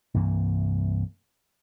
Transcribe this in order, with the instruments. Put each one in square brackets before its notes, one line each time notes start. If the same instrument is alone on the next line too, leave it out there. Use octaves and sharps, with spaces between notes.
[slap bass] C2 G2 E3 A#3